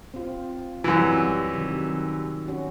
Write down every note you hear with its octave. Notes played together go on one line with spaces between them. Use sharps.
C4 F4
F#2 C3 E3 G3
C3 D#3 F#3
C#4 F#4